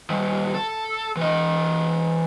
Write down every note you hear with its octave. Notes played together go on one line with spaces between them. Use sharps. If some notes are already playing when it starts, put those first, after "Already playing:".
D#3 G3
A4
E3 D#5